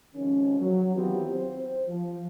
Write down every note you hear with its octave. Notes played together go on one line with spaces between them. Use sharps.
C3 D#3 F3 G#3 C#4
F#3
D#3 E3 B3 C4 F4 G4
C4 C5
F3